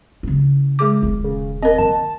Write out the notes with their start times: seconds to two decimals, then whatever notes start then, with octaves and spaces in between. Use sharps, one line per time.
0.23 C#3 E3
0.79 G#3 G#4 D6
1.02 D#1 D#3
1.24 C#3
1.63 C4 A#4 D#5
1.78 D#3 A#3 A5